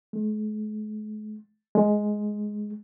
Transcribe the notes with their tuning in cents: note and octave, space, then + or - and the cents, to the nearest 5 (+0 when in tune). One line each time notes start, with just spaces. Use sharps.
G#3 +45
G#3 +5